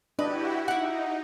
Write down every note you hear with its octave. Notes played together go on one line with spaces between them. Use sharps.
D4 E4 F#4 G4 B4 D#5
D#4 E4 F#5